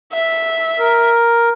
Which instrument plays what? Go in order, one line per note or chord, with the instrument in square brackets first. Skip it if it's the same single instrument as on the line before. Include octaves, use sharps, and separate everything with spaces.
[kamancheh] E5
[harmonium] A#4